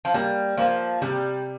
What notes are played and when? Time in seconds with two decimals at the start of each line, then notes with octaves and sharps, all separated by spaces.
0.05 F3
0.14 G3 A#3
0.58 F3 A#3
1.02 C3 G3